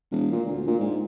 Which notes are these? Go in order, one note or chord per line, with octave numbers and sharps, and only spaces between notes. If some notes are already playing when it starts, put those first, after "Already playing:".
E1
A#2
D2
A#2
G#2